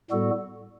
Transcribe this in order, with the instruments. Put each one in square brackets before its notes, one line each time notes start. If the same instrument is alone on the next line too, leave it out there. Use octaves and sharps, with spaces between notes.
[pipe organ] A2 G3 B3 F#4 A4